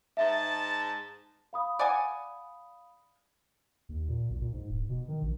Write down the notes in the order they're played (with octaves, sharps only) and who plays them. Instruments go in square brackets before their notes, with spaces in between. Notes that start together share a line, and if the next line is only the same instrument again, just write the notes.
[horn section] G#2 A5 [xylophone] E5
[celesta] F5 B5 D#6
[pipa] D5 F#5 G#5
[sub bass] D#2
A#2
B1
A#2
G#2
D1
B2
D#3
A#1